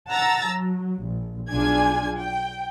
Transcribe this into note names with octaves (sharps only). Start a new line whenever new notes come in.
F#5 A5 A#5 E6 A6
F#3
A#1
B1 D4 F4 G#4 G#5 G#6
G5